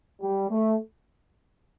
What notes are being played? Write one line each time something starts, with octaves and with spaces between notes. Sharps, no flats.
G3
A3